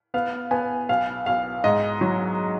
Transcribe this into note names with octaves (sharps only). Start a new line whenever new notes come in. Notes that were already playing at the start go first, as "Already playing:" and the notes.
B3 F5
B3 G#5
B1 F5
B1 F5
G#2 D#5
F#3